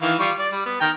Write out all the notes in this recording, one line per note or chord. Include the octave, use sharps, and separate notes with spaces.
D#3 E3 F5
G3 F4 C#6
D5
G3
B3
D#3 G5 A#5